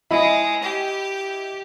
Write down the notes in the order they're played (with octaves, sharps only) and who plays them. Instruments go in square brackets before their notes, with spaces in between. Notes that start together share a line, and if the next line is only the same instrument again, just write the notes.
[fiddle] G#3 [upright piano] E4 D#5 B5
[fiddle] G4